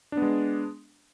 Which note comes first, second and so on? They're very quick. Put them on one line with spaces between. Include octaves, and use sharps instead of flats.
D4 B3 G#3